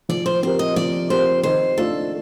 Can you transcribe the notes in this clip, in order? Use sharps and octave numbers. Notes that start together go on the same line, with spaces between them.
F3 D5
C5
C4 G4 A#4 C5
D#5
F3 D5
C4 G4 A#4 C5
D#3 C5
A3 D4 F4 A4